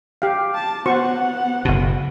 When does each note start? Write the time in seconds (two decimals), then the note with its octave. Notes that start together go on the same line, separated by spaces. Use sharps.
0.22 G4 F5
0.55 A5
0.86 B3 F#4 C5 F#5 C#6
1.65 F#1 B2